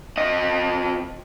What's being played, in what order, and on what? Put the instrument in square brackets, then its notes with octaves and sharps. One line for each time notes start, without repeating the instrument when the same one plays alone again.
[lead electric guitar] F2 D#5